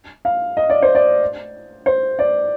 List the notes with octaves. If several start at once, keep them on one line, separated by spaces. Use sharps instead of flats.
F5
D#5
D5
C5
D5
C5
D5